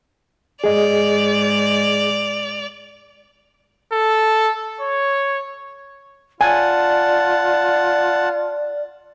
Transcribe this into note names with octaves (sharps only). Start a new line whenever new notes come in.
G#2 G#4 D5 D#5 F7
A4
C#5
F4 D5 F#5 G#5 A5